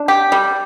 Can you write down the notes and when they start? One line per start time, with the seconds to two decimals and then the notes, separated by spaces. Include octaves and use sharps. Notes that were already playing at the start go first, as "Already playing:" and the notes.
Already playing: D4
0.08 G4
0.32 G3